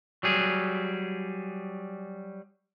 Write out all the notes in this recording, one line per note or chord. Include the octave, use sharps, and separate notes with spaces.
F#3 G3 G#4